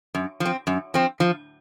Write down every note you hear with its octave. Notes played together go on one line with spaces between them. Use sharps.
F#2
F3
C4
F#2
F3 C4
F3